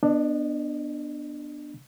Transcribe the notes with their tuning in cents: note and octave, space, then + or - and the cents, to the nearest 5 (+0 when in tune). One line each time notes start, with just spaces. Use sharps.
B3 +0 D4 +10 D#5 -30